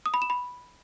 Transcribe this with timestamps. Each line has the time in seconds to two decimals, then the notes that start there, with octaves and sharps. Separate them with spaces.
0.06 D#6
0.14 B5
0.22 E7
0.30 B5